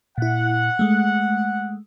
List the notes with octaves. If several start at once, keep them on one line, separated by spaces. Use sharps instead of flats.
A#2 E4 F#5
G#3 A3